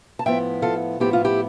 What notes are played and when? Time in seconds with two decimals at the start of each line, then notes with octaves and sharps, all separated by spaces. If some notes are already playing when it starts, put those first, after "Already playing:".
0.19 A5
0.26 A2 F3 B3 E4 E5 G5
0.62 F4 A4
1.00 A2 F3 B3 E4 G4
1.13 F4
1.25 E4 G4